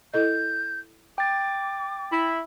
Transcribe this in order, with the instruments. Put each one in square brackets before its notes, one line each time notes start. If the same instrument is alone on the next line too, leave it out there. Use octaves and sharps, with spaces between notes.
[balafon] E4 A4 D#5 [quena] G6
[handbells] G5 A6 [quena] D6
[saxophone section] E4